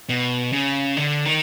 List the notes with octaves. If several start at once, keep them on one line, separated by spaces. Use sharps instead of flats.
B2
C#3
D3
D#3